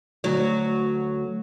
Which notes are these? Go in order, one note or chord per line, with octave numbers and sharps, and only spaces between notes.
D2 F#3